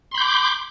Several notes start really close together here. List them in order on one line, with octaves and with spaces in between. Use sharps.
C6 B5 G6 D6